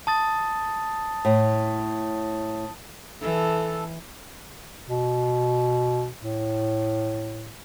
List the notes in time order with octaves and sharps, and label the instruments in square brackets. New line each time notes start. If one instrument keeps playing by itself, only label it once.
[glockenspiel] A5 D#6 A6
[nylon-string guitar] A2
[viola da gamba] E3 [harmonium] A4
[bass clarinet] B2
A2